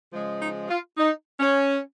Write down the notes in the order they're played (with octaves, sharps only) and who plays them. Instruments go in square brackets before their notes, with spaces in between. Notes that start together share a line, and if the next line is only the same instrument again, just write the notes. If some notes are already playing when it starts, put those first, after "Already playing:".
[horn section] C#3 F3 G#3
D#4
F4
D#4
C#4